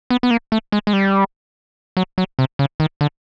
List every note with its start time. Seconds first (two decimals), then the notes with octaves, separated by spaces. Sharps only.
0.10 B3
0.23 B3
0.31 A#3
0.52 A3
0.72 G#3
0.87 G#3
0.93 G3
1.97 F#3
2.18 F#3
2.39 C3
2.59 C#3
2.80 D#3
3.01 D3